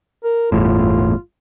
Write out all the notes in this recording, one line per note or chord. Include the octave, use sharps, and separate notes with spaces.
A#4
G1 E2 A2 F4